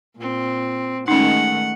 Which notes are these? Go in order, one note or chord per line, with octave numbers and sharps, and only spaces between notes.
A#2 C4
D#3 G#3 A3 C#4 D#4 F#5